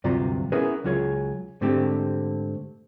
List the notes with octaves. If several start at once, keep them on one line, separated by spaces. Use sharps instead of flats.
D2 G2 C3 F#3 F4 A#5
B3 C#4 E4 G#4 A#4 B4
C#2 F#3 F4 G#4 C#5
G#2 D3 A3 C4 G4